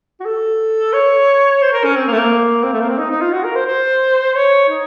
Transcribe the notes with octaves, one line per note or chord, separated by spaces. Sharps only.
F#4
A4
C#5
C5
A#4
C#4
C4
A#3
A3
A#3
C4
A3
A#3
C4
D#4
D#4
F4
F#4
A#4
C5
C5
C#5
D#4